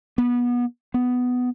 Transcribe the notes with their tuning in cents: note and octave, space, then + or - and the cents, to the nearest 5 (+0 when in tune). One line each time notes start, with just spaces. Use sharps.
B3 -25
B3 +10